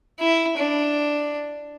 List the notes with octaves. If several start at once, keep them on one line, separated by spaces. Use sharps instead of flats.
E4
D4